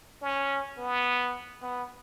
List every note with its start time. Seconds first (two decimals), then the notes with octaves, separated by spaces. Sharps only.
0.22 C#4
0.79 B3
1.63 B3